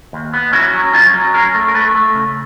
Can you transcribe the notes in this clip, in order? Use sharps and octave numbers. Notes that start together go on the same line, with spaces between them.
D#2
B3
C#4 E4 F#4
F#3
C#4 D#4 F4
F#3
C#4 G#4 A#4
A3
A#4
A3 A4 B4
A3
C#3